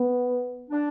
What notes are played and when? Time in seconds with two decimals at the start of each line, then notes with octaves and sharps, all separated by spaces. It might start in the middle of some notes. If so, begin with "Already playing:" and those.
Already playing: B3
0.70 D4